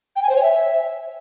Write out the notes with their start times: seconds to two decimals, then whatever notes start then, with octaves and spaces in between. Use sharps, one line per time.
0.16 G5
0.23 G#5
0.29 C5
0.36 C#5
0.43 E5